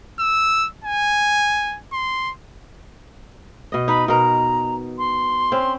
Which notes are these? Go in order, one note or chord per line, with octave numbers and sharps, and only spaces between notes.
E6
G#5
C6
B2 D#5
D#4 B4 B5
B2 A#4 A#5
C6
C4 C#4